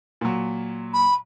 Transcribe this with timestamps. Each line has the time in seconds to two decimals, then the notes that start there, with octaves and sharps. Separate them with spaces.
0.21 A#2 F#3
0.93 B5